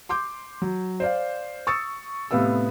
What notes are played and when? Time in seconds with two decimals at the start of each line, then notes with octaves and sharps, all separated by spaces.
0.09 C6 D6 G6
0.62 F#3
1.00 C5 D5 F5
1.67 C#6 D#6 E6 A6 C#7
2.31 A2 C3 B3 F5 E6